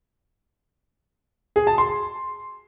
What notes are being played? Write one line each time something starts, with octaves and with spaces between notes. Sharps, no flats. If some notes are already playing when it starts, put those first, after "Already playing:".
G#4
A5
C6